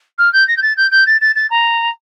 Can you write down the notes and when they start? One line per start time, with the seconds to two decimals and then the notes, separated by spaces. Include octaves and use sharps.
0.18 F6
0.33 G6
0.48 A#6
0.57 G6
0.62 A6
0.77 G6
0.91 G6
1.06 A6
1.21 A6
1.36 A6
1.50 A#5